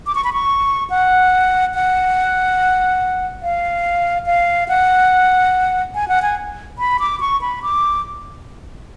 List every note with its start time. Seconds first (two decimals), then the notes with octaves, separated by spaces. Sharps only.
0.06 D6
0.15 C#6
0.24 B5
0.33 C#6
0.90 F#5
1.75 F#5
3.43 F5
4.26 F5
4.68 F#5
5.95 G#5
6.08 F#5
6.22 G#5
6.79 B5
7.00 D6
7.20 C#6
7.41 B5
7.63 D6